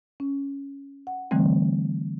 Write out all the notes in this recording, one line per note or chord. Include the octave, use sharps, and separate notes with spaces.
C#4
F#5
D3 E3 G3 A3 C4